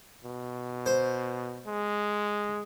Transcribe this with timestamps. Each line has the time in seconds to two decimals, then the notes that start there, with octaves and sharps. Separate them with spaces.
0.24 B2
0.86 C5
1.66 G#3